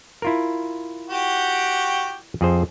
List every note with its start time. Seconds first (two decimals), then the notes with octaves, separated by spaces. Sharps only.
0.22 E4 F4 A#4
1.10 F#4 G4 G5
2.41 F2 G#4 C5